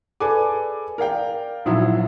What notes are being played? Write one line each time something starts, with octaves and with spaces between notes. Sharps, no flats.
G#4 A4 B4 D5 G#5 D6
A#4 D5 F5 G5
A#1 G#2 F3 F#3 E4